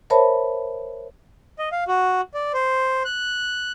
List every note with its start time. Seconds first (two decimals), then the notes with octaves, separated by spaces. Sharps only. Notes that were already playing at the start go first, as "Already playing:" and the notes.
0.10 A#4 C5 C#5 E5 A5 B5
1.59 D#5
1.72 F5
1.88 F#4
2.34 D5
2.54 C5
3.05 F#6